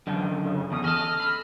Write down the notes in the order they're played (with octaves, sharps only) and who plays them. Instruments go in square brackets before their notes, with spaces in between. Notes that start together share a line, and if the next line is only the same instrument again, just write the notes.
[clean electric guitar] F#2 D3 [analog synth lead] F3
[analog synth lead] D#3
C#3
[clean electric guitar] E2 [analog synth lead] C#4 [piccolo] D#6
[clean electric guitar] G#4 A4 [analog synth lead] D#5 [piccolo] F6
[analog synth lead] B5